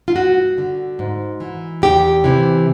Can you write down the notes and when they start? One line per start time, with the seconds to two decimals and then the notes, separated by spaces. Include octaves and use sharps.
0.08 F4
0.15 G2 F#4
0.58 D3
0.99 G#2
1.40 E3
1.82 E2 G4
2.24 C3 E3